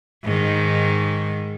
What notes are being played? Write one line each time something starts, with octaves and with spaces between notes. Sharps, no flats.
G#2 D#3